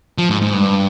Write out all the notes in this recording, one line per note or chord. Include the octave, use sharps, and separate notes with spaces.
F3
G#2
G#2
G2